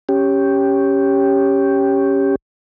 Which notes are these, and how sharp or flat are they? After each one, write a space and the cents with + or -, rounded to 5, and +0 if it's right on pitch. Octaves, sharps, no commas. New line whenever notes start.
C#4 +0 G4 +0